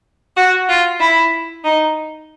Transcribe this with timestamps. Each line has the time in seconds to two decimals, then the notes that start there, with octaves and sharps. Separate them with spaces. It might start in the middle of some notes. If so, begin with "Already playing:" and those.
0.36 F#4
0.69 F4
1.00 E4
1.64 D#4